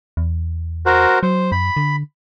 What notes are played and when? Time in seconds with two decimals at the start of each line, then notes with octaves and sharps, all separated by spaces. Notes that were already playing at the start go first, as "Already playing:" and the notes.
0.17 E2
0.86 F#4 A#4 C5
1.23 F#3 C5
1.52 F#2 B5
1.77 D3